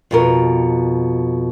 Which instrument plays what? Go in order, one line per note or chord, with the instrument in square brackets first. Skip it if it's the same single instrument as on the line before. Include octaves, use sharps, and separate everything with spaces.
[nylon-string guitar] F2 B2 A#4